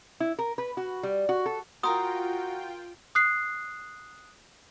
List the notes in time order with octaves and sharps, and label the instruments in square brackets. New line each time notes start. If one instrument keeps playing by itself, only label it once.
[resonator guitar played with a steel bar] E4
A#4
B4
F#4
G3
F#4
A4
[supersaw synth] F4 G5 [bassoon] F#4 [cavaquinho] A#4 A#5 C6 [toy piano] D#6
[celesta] D#6 F#6 C7